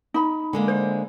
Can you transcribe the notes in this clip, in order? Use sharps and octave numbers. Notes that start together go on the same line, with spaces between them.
D#4 B5
D3 G#3 A#3
C5